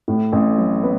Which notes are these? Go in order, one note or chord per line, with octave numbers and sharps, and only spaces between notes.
A2
A1
F#3
B3